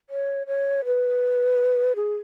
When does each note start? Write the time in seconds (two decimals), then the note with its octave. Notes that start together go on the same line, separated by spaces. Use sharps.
0.10 C#5
0.47 C#5
0.85 B4
1.96 G#4